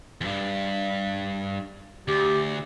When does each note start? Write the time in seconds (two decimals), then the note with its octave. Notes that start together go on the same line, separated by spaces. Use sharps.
0.21 E2 G2
2.08 D2 G4